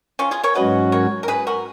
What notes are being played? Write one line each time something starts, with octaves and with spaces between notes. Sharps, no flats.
C#4 F4
F4 G#4
A#4 C#5
G#2 F#3 C#4 F#4 B4 D#5
A#4 C#5
A#4
G#4 B4
F#4 A#4